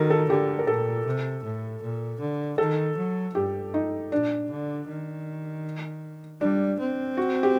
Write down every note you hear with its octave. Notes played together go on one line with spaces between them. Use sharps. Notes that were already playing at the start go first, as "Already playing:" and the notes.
Already playing: D#3 F#4 A4 A#4
A4
D3 G4
A#4
A#2 A4
C3
A2
A#2
D3
D#3 A4
F#3
G2 G4
D#4
A#2 D4
D3
D#3
G3 D4
C4
F#4
G4